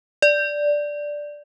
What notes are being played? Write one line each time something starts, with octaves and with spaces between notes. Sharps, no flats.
D5